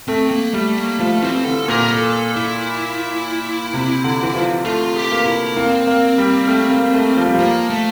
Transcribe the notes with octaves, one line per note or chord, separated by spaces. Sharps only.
A3 C4
A#3
G3 A3
A#3
F3 A3
E3 C4
D3 A4
A#2 A#4
A4
E4
C3
D3
E3
F3
A3 F4
G4
A#3
E4
A#3 C4
A#3
G3
A3
A#3
A3
F3
G3
F3
A#3
A3